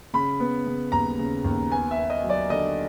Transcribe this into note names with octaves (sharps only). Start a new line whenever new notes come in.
C#3 B5
B3
C#3
D#2 A#5
C#3
D#2
B3 G#5
E5
B3
D#5
F#3
D5
D3 D#5